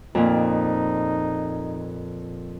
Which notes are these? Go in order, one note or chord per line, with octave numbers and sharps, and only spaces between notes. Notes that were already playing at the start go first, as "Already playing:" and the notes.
F2 A#2 D#4